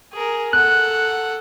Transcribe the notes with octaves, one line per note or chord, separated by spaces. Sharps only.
G#4 A#4
A4 F#5 F#6